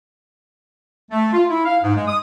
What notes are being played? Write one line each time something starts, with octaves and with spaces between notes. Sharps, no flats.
A3
F4
E4
F5
G#2
G#3
D#6